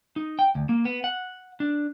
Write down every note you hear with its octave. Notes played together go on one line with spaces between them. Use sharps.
D#4
G5
D2
A#3
B3
F#5
D4